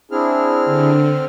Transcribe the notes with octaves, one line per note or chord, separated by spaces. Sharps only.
C4 D4 E4 G#4 F6
D3